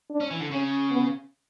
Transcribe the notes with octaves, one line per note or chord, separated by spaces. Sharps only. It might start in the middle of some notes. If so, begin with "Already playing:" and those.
D4
C#4
E3
D3
C#3 C#4
B3